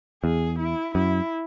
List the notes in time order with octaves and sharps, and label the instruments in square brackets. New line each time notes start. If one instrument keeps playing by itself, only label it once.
[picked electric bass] E2 [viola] G#4
[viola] E4
[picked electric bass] F#2 [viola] E4